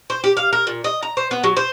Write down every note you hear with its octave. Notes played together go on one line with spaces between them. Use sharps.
C5
G4
F5
A#4
A#2
D#5
A#5
C5
B3
F#3
C5